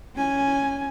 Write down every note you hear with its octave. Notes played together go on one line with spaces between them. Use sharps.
C#4 G#5